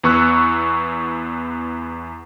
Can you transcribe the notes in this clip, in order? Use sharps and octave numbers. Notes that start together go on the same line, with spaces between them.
E2 B3 C#6 E6 F#6